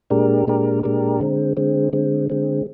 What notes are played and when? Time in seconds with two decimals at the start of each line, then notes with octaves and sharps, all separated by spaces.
0.10 A#2 G#3 D4 G4 A#4
0.47 A#2 G#3 D4 G4 A#4
0.83 A#2 G#3 D4 G4 A#4
1.20 D3 G#3 C4
1.57 D3 G#3 C4
1.93 D3 G#3 C4
2.30 D3 G#3 C4